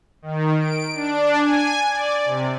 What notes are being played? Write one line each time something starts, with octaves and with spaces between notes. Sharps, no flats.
D#3
D7
D4
G#5
D5
C3